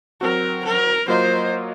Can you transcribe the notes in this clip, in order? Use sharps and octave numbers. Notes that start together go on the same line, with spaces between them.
F#3 C4 F#4 A#4
A#4
F#3 A#3 F4 A#4 C5 D#5